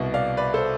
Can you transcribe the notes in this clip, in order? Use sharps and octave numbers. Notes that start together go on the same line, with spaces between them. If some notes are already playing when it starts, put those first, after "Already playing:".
Already playing: C2 B2
D5 F5
B4 D5
A4 C5